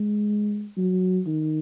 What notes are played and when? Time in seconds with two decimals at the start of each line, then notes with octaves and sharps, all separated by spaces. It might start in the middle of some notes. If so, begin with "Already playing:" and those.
Already playing: G#3
0.77 F#3
1.27 D#3